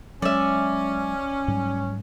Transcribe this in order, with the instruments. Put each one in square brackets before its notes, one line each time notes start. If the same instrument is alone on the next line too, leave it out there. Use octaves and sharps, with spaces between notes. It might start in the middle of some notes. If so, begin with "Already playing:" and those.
[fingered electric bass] F#3 G#3 [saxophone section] C#4 [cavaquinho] D5 E5
[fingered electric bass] G#2 F#3 G3